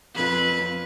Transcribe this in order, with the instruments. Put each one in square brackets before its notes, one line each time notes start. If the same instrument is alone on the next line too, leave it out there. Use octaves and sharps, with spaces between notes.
[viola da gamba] F2 B4